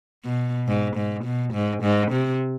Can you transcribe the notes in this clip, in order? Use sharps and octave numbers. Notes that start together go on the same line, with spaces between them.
B2
G#2
G#2
B2
G#2
G#2
C3